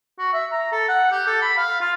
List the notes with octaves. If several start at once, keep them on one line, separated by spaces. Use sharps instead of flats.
F#4
E5
A#5
A4
F#5
G4
A4
B5
F5
F4